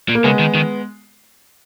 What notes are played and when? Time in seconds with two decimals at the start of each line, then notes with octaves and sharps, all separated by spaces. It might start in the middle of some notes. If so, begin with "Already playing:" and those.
0.08 A#2
0.15 A#3
0.24 C#3 G#3 B3
0.39 D#3
0.55 D#3